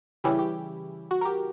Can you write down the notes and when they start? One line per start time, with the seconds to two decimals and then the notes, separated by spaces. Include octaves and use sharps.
0.24 C#3 E3 G3 C#4 E4 G4
0.39 G4
1.11 F#4
1.21 A#4
1.25 G4